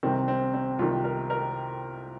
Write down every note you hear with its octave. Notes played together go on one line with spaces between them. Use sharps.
C2 C3 D#3 C4
C4
C4
C2 C3 D#3 F4
A#4
A#4